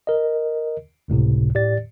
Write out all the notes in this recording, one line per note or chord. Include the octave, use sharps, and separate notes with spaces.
A#4 D#5
G1 C#2 A2 C3
A2 G4 D5 A6